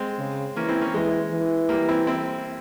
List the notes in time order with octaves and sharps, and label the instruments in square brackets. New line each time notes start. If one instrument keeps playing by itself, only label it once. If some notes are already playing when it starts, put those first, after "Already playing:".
Already playing: [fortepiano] G#3 C4
[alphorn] C#3
[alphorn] E3 [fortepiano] A#3 C#4
[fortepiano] C4 E4
A#3 C#4
[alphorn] E3 [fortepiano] G#3
[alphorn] E3
[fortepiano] G3 A#3
C4 E4
C4 E4